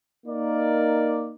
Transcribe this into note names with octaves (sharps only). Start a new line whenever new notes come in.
A#3 D#4 A#4 D5